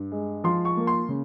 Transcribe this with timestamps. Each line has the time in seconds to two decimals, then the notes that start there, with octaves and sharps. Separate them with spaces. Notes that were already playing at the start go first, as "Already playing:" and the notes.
Already playing: G2
0.11 G#3
0.44 F3 C6
0.65 C#6
0.77 A#3
0.87 C6
1.09 C#3